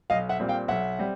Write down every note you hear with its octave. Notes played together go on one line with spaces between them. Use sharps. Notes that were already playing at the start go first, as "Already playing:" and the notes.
B1 D#5 F5
E5 F#5
A#2 G3 C4
F5 G5
B1 E5 F#5
G3 C4